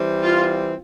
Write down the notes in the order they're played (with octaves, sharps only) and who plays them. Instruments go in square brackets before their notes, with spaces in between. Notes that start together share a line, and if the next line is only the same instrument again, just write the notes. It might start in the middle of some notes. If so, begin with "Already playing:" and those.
Already playing: [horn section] E3 G3 C4
[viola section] F4